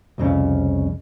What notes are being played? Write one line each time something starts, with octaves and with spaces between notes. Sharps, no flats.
C2 F2 C#3